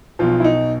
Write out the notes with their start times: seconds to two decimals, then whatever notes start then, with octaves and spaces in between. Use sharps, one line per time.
0.19 B1 B2 F3 F4
0.40 E4
0.44 D#4